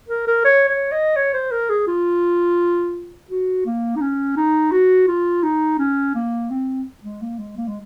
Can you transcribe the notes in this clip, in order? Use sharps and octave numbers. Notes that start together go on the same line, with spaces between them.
A#4
A#4
C#5
C#5
D#5
C#5
C5
A#4
G#4
F4
F#4
A#3
D#4
C#4
D#4
F#4
F4
D#4
C#4
A#3
C4
G#3
A#3
G#3
A#3
G#3